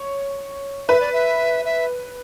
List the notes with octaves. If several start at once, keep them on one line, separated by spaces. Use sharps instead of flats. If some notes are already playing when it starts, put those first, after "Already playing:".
Already playing: C#5
B4 E5
D5
E5
E5